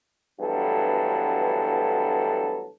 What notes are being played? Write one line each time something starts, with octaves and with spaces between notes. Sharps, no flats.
D2 G2 E3 F#3 B3 A4